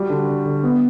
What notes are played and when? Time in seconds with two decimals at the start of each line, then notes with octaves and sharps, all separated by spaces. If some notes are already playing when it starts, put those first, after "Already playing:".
Already playing: G3 F#4
0.10 D3
0.28 D3
0.46 D3
0.64 B3